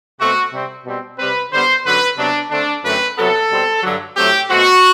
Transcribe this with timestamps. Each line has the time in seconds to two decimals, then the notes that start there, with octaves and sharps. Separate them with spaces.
0.20 B2 A3 C4 F#4
0.52 C3 G3 C4
0.85 B2 G3 C4
1.18 C3 G3 C4 B4
1.52 D3 G3 B3 C5
1.85 F#2 D3 F#3 B4
2.17 C3 F#3 B3 D4
2.51 D3 A3 C4 D4
2.84 F#2 D3 A3 C4 B4
3.17 C3 F#3 B3 A4
3.50 B2 G3 C4
3.83 G2 D3 F#3
4.16 A2 F#3 A3 C4 G4
4.49 B2 A3 C4 F#4